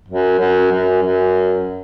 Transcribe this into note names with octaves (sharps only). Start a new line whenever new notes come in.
F#2
F#2
F#2
F#2